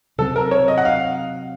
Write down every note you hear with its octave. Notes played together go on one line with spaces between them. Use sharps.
C3 F#3 C4 A4
A#4
C#5
D#5
F#5
F5